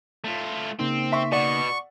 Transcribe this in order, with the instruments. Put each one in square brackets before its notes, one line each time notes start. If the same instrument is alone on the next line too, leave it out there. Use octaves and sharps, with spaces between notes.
[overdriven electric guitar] A3 F4
[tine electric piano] C#3 A#3 D#4 [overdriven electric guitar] C4
[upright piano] E5 C6 C#6
[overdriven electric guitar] B2 [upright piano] D5 F#5 [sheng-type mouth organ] C#6